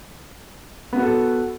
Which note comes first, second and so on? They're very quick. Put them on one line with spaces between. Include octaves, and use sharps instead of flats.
B3 F#4 A4